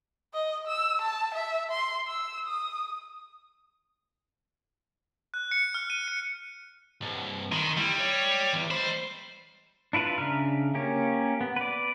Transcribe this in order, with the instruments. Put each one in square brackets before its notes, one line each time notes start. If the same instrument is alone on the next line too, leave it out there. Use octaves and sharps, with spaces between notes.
[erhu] D#5
E6
A5
E5
C6
E6
D#6
[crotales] F#6
C#7
F6
D#7
C#7
[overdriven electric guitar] C2 G2
[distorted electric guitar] D#3 [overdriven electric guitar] B5 C6
[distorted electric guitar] G3 [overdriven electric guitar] E4
[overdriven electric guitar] C#5
E2
[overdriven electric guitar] G#3 B5 [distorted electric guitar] C5
[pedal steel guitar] D4 E4 F4 B4
C#3 D4 E5 A#5 F6
A#3 C#4 G4
B3
B4 D5